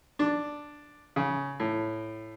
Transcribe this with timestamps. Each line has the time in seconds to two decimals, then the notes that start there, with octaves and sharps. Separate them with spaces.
0.19 D4
1.16 C#3
1.60 A2